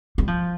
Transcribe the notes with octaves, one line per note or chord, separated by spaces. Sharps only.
G3
F3